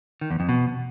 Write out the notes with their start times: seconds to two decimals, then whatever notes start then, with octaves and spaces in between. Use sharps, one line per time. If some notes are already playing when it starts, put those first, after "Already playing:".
0.21 D#3
0.31 E2
0.40 F2
0.49 B2